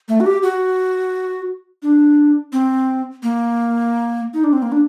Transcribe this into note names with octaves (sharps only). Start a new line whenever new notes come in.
A3
F#4
G4
F#4
D4
C4
A#3
D#4
D4
C4
A#3
D4